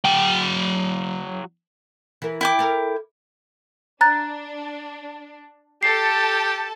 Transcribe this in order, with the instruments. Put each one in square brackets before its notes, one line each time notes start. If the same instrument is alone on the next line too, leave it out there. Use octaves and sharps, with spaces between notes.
[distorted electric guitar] F#3 G5
[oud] E3 A#4
[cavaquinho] E4 G5 D6
[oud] A4 A#4
[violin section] D4 [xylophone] A#5 F#6 A6
[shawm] G4 [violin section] A4 A5 [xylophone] C7